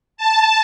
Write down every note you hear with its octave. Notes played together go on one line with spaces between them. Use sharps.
A5